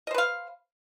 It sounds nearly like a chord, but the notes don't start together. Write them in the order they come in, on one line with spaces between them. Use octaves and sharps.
D#5 C5 B4 F5